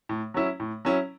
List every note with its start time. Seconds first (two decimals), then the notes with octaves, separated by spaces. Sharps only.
0.09 A2
0.34 F#3 C#4 E4
0.60 A2
0.85 F#3 C#4 E4